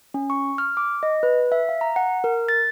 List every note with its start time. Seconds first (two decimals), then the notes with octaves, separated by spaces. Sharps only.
0.14 C#4
0.30 C#6
0.58 F6
0.77 D6
1.03 D#5
1.23 B4
1.52 E5
1.69 F5
1.81 A#5
1.96 F#5
2.24 A#4
2.49 A6